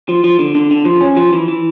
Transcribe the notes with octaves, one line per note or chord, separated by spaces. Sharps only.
F3
F3
D3
D3
D3
F3
C#4
F3
E3
E3